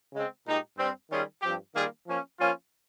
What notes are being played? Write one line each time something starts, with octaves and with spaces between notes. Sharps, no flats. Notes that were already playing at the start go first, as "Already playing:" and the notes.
C#3 G#3 C4
A#2 G#3 D#4 G4
G2 G3 C4
D#3 G3 C#4 F4 G#4
G2 F3 C4 G4
D#3 G3 A#3 F4 G#4
F3 A#3 C#4
F3 A#3 C#4 F4